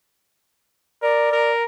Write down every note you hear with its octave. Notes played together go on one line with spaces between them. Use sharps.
A#4 D5
A#4